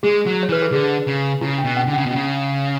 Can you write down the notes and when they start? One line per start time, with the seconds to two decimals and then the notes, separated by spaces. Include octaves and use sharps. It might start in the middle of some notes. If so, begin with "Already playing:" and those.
0.03 G#3 G#4
0.26 F#3
0.43 C#5
0.49 E3 B4
0.62 A4
0.72 D3 G#4
1.07 C#3
1.41 C#3 E4
1.58 D4
1.65 B2
1.77 C#4
1.87 D3
1.93 C#4
1.98 C#3
2.06 B2
2.11 C#3 C#4